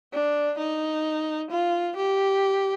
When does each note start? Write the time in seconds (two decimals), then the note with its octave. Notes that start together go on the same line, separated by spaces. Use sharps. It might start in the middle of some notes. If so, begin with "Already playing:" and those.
0.13 D4
0.58 D#4
1.50 F4
1.96 G4